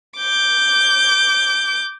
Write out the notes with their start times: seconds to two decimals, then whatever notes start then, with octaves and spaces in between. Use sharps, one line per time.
0.18 D6 G6